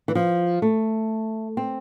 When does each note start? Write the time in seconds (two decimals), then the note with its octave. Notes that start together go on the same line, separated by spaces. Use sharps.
0.08 E3
0.15 F3
0.62 A3
1.57 C4